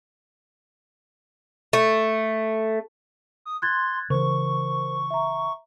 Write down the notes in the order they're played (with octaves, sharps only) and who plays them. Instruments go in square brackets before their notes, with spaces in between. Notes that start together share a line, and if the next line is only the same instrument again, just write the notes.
[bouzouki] A3
[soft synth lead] D#6
[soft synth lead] C6 [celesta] F#6 G#6 A6
[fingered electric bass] C#3 E3 [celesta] A#4 C5 [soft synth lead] C#6
[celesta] E5 A#5